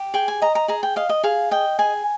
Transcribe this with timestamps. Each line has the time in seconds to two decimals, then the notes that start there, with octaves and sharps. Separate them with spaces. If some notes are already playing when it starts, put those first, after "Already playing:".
Already playing: G4
0.14 G#4 G5
0.28 G#5
0.42 D#5 A#5
0.55 A#5
0.68 G#4 A#5
0.83 G5
0.96 D#5 F5
1.09 D#5
1.23 G#4 F5
1.51 D#5 G5
1.79 G#4 G#5